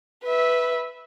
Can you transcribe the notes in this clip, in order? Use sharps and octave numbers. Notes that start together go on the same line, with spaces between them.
B4 E5